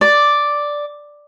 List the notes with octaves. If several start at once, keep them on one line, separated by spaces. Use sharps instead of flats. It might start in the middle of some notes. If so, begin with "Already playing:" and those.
D5